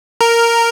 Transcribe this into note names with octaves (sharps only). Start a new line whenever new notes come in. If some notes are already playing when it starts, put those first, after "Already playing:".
A#4